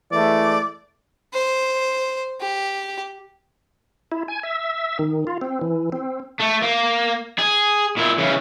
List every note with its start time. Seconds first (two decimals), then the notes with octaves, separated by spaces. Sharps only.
0.12 E3 G#3 A3 D5
1.33 C5
2.41 G4
4.12 E4
4.28 G#5
4.43 E5
4.99 D#3
5.27 F4
5.41 C4
5.61 E3
5.92 C4
6.40 A3
6.62 A#3
7.39 G#4
7.97 A#2 E4
8.18 C#3 E3